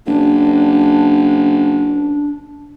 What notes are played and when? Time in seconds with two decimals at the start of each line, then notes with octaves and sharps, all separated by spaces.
0.06 F#1 D4